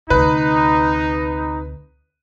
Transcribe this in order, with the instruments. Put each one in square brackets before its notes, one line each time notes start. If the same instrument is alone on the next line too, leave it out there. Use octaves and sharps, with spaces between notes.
[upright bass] D2 C3 [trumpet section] D#4 [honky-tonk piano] B4